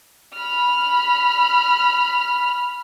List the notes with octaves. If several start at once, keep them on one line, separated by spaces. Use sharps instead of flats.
B5 F6